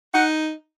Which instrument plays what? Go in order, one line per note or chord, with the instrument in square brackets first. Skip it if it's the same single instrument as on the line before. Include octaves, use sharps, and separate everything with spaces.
[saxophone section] D#4 F#5